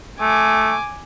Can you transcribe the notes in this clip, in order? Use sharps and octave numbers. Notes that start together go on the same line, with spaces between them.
A3 G#5 D6